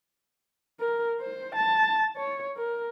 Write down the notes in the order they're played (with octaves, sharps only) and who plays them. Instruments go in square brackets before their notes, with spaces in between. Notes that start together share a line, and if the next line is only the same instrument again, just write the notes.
[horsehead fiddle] A#4
C5
A5
C#5
A#4